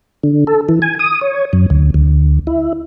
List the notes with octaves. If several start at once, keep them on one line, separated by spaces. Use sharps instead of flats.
D3
A4
E3
G#5
D#6
C#5
F#2
D2
D2
E4